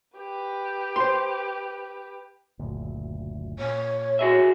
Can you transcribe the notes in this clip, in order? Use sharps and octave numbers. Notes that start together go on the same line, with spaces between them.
G4 B4
C5 C6
F#1 D2 A#2
A#2 C#5
F#4 G#4 E5